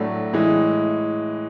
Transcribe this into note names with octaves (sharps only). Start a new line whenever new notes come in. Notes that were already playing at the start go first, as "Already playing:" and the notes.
Already playing: A2 F#3 A3 D4
A2 E3 G#3